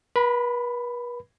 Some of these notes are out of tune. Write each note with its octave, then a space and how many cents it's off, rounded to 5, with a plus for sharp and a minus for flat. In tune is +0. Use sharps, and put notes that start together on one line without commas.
B4 -40 B5 +15